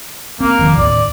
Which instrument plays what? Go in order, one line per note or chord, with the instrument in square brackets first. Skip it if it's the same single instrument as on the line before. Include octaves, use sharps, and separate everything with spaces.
[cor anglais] A#3 [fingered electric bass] C4
[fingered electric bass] E1 D#3 F3
[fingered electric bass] D#2 A2 [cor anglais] D5